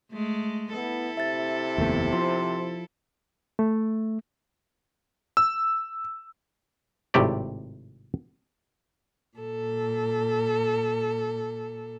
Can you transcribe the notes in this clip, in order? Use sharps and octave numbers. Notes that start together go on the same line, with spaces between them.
G#3 A3
B3 E4 A4
C3 E5 A6
F1 D#2 A3 B3
F3 C6
A3
E6
G#1 A2 C3 G4 D5
A#2 A4